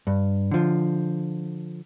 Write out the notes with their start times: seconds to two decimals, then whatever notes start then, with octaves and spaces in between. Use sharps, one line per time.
0.07 G2
0.51 D3 F3